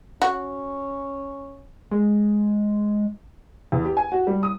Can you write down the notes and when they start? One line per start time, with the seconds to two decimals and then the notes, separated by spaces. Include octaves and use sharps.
0.22 C#4 F#4
1.91 G#3
3.72 E2
3.85 G4
3.97 G#5
4.12 F#4
4.27 G3
4.43 D#6